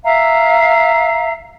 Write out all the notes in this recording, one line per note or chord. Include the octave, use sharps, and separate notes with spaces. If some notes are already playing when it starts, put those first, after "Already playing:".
E5 F5 A#5